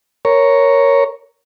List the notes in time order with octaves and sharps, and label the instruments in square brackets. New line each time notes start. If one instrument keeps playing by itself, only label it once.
[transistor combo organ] A#4 C#5